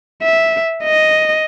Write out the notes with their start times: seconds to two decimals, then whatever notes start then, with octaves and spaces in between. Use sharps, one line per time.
0.23 E5
0.84 D#5